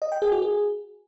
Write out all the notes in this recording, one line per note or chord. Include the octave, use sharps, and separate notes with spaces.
D#5
G5
G#4
F#4
G#4